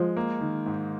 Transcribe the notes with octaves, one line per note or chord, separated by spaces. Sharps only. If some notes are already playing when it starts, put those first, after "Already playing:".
Already playing: F3 G#3
A#3
D#3
G#2